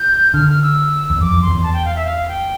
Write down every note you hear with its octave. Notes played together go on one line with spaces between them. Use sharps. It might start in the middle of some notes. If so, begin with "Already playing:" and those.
Already playing: G6
D3 F6
F6
E6
E2
F2 D6
F2
C6
E2
A5
G5
F5
E5
F5
G5